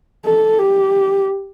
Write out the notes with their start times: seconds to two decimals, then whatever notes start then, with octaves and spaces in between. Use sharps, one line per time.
0.25 A4
0.59 G4